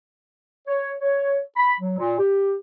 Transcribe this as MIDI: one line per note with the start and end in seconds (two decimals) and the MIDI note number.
0.67 0.94 73
1.01 1.39 73
1.57 1.73 83
1.80 1.98 54
1.98 2.16 46
2.19 2.54 67